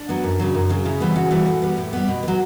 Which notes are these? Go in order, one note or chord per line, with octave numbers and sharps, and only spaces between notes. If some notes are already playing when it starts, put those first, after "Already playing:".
Already playing: D4
F#3 B3
F#2
C#3 F#3
F#2
C#3 F#3
C#3 E4
E3 G3 B3
C#3 F#4
E3 G3 B3
A2
G3 B3
A2 G4
G3 B3
B2
F#3 B3